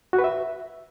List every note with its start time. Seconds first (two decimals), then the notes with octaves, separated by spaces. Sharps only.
0.13 F#4
0.19 B4
0.24 E5